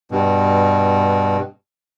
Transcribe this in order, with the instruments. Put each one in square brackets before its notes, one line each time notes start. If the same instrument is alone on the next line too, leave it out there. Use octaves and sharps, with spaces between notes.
[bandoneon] G2 B2